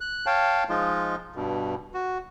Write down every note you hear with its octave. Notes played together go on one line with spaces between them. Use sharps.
F#6
C#5 F5 G5 A5
F3 G#3 D#4 F4
G2 B2
F#4